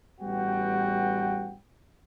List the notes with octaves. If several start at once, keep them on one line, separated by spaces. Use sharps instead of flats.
A1 G3 B3 F#4 G5